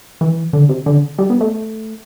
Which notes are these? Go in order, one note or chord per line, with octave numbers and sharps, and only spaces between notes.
E3
D3
C3
D3
G3
B3
A3